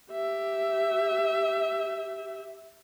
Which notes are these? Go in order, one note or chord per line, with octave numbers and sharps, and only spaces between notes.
G4 E5